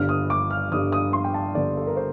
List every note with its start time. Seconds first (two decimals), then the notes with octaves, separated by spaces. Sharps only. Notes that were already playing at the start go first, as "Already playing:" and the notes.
Already playing: G1 G2 D3 F6
0.09 D#6
0.30 D6
0.51 F6
0.71 G1 G2 D3 D#6
0.92 D#6
1.13 C6
1.24 G5
1.34 A5
1.55 G1 G2 D3 D5
1.77 A4
1.87 A#4
1.97 C5